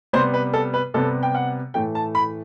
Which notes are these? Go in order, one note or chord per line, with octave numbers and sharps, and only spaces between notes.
C3 G3 B3 C5
B4
A4
B4
C3 G3 B3 A4
G5
F#5
A2 E3 A3 G5
A5
B5